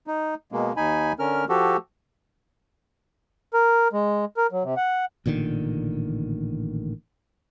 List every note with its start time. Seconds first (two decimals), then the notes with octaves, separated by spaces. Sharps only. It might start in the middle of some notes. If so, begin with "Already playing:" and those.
0.07 D#4
0.52 B2 G#3 A#3
0.77 D#2 D#4 G#5 B5
1.19 D3 C#4 A#4 F6
1.49 F3 F#4 G4 A4
3.54 A#4
3.93 G#3
4.37 A#4
4.52 F#3
4.64 C3
4.77 F#5
5.26 A1 A#2 D3 D#3